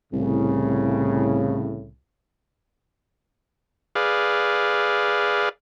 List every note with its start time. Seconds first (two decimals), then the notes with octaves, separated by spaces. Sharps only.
0.13 C2 A2 C#3
3.95 G#4 B4 D5 F5